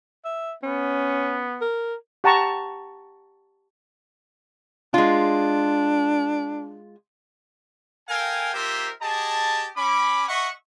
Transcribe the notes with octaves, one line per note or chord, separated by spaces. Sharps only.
E5
B3 C#4
A#4
G4 F#5 A5 A#5 C#6
G#3 D4 F4
A4 A#4 F5 G5 G#5
A#3 F4 G4 A#4 C5 E5
G4 G#4 D#5 A5
C#4 B5 D6
D#5 E5 F#5 C#6